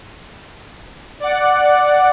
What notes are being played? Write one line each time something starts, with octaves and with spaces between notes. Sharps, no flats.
D5 F#5